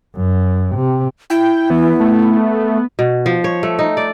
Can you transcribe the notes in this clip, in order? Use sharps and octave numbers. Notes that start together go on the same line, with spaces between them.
F#2
C3
E4 G5
E3 B3
A3
B2
F3
C#5
A3
D#4
D5